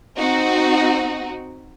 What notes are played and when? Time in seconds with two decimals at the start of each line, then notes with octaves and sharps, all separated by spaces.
0.17 C4 D#4 F#4